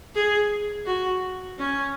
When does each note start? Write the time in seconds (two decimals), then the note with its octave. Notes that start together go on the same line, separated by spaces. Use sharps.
0.15 G#4
0.86 F#4
1.59 C#4